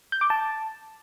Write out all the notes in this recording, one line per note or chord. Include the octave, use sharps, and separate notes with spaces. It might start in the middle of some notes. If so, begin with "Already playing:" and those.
G6
D6
A5